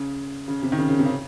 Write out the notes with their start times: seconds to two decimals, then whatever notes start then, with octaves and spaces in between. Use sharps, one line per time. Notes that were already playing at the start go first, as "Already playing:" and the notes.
Already playing: C#3
0.48 C#3
0.62 C3
0.72 D#3
0.79 C#3
0.89 C#3
0.99 C3
1.06 C#3